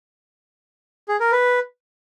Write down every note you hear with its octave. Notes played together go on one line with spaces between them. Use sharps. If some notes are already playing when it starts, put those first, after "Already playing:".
G#4
A#4
B4